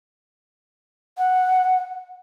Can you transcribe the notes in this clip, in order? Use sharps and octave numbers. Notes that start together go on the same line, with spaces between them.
F#5